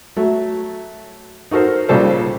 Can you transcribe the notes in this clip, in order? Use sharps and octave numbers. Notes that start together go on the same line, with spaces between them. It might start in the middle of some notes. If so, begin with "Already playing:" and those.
F#3 A3
D#4 F#4 A4 A#4 C5
A#1 C#3 G3 A4 C5